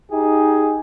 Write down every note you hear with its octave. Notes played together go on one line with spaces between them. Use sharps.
D#4 G4 G#4